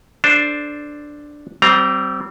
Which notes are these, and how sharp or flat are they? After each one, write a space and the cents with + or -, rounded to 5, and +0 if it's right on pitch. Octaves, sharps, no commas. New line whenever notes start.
D4 +0 A4 +0 C5 +0
G3 -35 C4 -10 A#5 +0